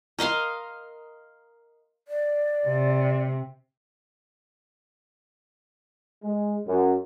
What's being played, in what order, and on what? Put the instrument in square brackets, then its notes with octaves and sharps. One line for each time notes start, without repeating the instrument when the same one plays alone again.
[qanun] A#4 D#5 F5 C6
[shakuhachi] D5
[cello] C3
[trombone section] G#3
F#2